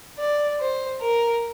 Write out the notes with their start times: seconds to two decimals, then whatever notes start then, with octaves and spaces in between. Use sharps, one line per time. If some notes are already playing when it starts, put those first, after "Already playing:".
0.19 D5
0.60 C5
1.01 A#4